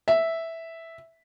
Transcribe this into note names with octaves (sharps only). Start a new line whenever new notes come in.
E5